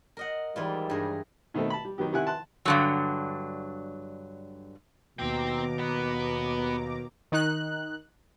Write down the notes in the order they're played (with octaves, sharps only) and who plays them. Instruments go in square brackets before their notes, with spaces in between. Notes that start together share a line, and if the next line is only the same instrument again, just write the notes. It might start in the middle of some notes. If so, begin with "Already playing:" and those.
[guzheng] A#4 D#5 F#5
[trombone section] G#2 D#3 G3 [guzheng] E3 E4 F4
[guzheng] G2 G#4 A#4
[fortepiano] B2 D#3 A3 C4 A4
A5 B5
G3
D#3 F#3 B3 G4
C3 D#3 E4 F#5 G#5 F#6
A5 C6 F#6
[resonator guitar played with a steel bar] G2 D3 F#3
[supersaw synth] D#2 A#5 D6 [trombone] B2 [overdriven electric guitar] C4 G5
[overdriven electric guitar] B3
[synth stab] D#3 D#4 F#6